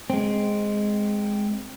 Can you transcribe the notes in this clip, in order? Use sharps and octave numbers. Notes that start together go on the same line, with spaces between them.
G#3 C4